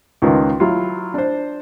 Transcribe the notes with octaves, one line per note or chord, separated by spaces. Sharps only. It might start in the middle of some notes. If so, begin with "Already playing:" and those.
C#2 D#3 F4 A#4 B4
F#3 E4 F4
D4 C5